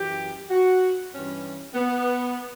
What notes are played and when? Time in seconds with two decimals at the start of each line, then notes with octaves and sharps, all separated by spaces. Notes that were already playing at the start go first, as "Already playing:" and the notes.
Already playing: F#2 E3 G4
0.49 F#4
1.12 G2 E3 C#4
1.74 B3